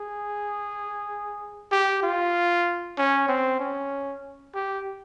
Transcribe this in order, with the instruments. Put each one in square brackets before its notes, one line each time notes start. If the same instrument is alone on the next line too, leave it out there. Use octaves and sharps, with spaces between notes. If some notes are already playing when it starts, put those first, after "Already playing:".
Already playing: [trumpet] G#4
G4
F4
C#4
C4
C#4
G4